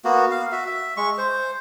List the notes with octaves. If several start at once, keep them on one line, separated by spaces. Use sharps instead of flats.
A#3 B3 F#4
F5
F#4 E5
E5
G#3 C#6
C5